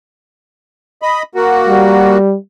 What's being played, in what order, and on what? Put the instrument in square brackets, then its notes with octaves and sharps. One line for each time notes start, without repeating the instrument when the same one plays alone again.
[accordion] D#5 B5
A#3 F#4
[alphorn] G3